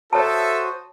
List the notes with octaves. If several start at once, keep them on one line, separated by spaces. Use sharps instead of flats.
F#4 A4 C5 C#5 E5 A5 D#6